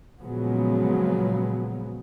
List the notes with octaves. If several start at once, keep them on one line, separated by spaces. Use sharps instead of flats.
A#2 C#3 F3 F#3 G#3 B3